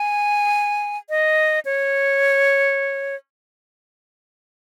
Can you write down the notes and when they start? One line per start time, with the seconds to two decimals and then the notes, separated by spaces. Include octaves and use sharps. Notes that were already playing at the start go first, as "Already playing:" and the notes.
Already playing: G#5
1.10 D#5
1.65 C#5